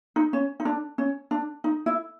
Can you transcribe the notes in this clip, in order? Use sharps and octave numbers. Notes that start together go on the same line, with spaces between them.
D#4
C#4
D#4
D4
C#4
D4
D#4
E4